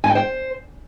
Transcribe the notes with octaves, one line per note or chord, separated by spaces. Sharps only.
G#5
G5
C5